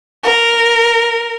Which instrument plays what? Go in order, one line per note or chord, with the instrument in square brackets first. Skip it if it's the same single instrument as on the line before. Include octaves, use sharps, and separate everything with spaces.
[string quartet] A#4